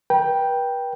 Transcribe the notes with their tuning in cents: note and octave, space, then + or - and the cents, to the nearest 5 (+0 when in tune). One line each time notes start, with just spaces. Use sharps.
B4 -40 G5 +0